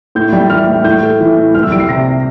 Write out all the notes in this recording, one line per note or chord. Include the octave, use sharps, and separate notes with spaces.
A2 G6
G3
E3 F6
A2
A2 G6
A3
E3
A2
C2 F6
E6
G3 D7
C7
C3 A#6